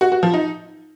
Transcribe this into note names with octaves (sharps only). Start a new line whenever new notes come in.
F#4
F#4
F3
D#4